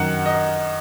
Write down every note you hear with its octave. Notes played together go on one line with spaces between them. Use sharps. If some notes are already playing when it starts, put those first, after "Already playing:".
Already playing: F#2 D#3 F#5
D#5